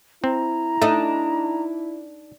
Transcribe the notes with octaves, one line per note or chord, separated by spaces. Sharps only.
C4 E4 A#5
A3 D4 D#4 D#5